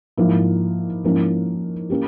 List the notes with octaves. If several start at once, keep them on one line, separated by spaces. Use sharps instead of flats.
G#2 F3 A#3 E4
G#2 F3 A#3 C#4 E4
A#3 C#4 G4